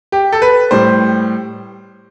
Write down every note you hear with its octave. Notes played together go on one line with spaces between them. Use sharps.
G4
A4
B4
A2 G3 C5